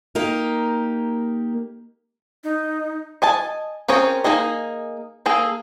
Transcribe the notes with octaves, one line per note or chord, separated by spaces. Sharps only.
A#3 D#4 G4 A#4
D#4
D#5 G#5 A5
C4 C#4 G#4 A#4 C#5
A#3 D#4 G#4 D#5
A#3 G#4 A4